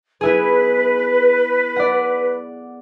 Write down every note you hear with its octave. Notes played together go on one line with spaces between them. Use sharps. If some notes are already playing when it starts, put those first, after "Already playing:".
B3 E4 G#4 B4
D5 F#5